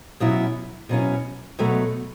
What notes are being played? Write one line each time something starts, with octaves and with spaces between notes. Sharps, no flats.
B2 F#3 C#4 E4
B2 F#3 C#4 E4
B2 F#3 A3